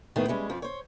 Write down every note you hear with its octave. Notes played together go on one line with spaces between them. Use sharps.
A2 D#3 B3 G#4
G3 G#3 C#4
F2 F3
C5 C#5